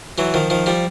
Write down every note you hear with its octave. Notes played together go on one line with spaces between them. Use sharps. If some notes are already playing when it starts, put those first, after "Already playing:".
E3 F#3
D#3 F3
D#3 F3
F3 G3